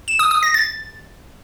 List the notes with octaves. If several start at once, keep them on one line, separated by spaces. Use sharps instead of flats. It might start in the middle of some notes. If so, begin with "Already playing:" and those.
E7
D#6
D#6
A#6
A6